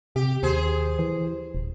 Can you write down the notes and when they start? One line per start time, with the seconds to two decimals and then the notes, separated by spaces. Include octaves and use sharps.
0.16 C3 G4
0.43 D#2 G#4 C5
0.99 E3
1.55 D#1